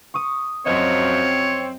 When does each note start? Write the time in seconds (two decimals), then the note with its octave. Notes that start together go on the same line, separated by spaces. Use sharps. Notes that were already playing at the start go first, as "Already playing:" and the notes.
0.14 C#6 D#6
0.66 F#2 F3 F#3 C4 C#5 D#5